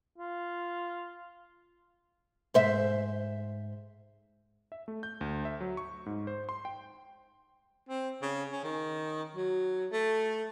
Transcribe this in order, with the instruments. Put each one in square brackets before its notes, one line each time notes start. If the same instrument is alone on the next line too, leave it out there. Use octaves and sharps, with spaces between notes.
[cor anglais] F4
[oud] G#2 C5 E5
[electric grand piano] E5
A3
G6
D2
E5
F#3
C#6
G#2
C5
C6
G5
[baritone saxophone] C4
C#3
C#4
D#3
F#3
A3